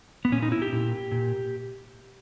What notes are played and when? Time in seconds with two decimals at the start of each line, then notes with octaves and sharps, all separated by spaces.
0.25 B3
0.32 A#2 C#4
0.42 D#4
0.52 E4
0.62 G4
0.72 A#2
1.12 A#2